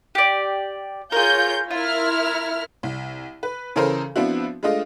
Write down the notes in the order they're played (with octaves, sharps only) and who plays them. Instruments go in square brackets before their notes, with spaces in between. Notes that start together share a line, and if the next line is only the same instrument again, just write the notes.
[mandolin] G4 D5
[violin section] F4 C#5 G6 [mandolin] G#4 A#4
[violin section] E4 A#4 F6 [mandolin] F4
[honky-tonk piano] C2
B4
C#3 E3 C#4 A4 A#4 C5
F3 B3 C4 D4 E4 F#4
G#3 A3 D4 F4 D#5